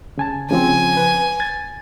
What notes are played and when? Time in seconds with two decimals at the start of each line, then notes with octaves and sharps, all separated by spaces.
0.18 C#3 G#5 A5
0.50 C#3 F3 C4 G#5
0.97 B4
1.40 G#6 A6